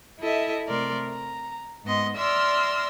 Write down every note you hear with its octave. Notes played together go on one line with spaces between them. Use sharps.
E4 A4 D#5 E5
C3 A3 A#4 D5 C6
A#5
G#2 B3 D#5 C6
D5 E5 C6 E6 F6 A#6